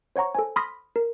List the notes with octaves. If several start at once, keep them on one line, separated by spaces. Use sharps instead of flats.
C5 C#5 F#5 A#5 C#6
A4 C5 G#5
B5 C6 D#6 F6 A#6 B6
A#4